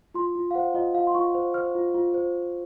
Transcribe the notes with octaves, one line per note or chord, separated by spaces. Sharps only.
F4 C6
F4
F5
C5 F#5
F4 D#5
F4 F5
C6
F4 C#6
C5
C5 F6
F4
F4
C5